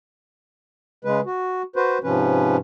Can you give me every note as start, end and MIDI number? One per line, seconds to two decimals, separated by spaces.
1.05 1.20 49
1.05 1.20 56
1.05 1.20 71
1.26 1.62 66
1.76 1.98 66
1.76 1.98 71
1.76 1.98 72
2.04 2.57 44
2.04 2.57 48
2.04 2.57 53
2.04 2.57 61
2.04 2.57 71